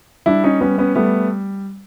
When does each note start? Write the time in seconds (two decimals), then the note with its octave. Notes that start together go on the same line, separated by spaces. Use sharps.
0.26 G3 D4 E4
0.44 C#4 D#4
0.60 G3 B3 C#4
0.78 B3 C#4
0.95 G3 A3 B3